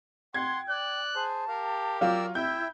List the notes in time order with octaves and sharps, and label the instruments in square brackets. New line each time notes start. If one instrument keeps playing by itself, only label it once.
[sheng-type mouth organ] F#5 [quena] G5 [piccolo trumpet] C6 [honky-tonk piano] G#6
[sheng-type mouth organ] D5 [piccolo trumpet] F#6
[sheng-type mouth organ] G#4 C5 [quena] A5
[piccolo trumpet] G4 [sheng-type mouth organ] A#4 F5
[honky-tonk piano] F#3 F4 [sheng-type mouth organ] A#4 D5 E6 [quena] G5
[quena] E4 [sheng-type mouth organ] E5 G5 [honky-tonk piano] G6